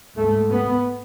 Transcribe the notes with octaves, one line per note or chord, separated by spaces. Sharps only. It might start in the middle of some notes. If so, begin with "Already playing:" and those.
G#2 A3
B3